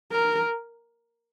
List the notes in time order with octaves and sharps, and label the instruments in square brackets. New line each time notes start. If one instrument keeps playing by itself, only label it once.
[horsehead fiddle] A#4